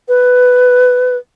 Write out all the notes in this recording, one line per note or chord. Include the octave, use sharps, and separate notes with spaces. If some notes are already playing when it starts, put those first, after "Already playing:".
B4